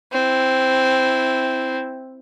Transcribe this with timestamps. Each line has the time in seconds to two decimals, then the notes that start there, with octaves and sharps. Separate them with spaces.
0.12 C4 E4